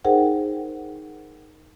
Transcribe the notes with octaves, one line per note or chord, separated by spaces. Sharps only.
D#4 G#4 A#4 C5 F#5 G5